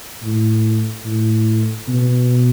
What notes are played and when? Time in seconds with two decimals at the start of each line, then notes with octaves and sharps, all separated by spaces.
0.23 A2
1.05 A2
1.88 B2